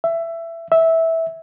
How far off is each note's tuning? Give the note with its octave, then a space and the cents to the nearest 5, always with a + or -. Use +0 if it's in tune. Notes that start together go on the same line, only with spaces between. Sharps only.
E5 +20
E5 -10